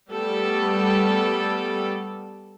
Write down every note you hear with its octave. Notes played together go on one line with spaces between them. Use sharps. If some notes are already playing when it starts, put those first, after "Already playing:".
G3 A3 B3 G4 A4